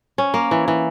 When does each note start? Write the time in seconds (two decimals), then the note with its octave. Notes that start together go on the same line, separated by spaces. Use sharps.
0.18 C#4
0.34 A#3
0.51 E3
0.68 E3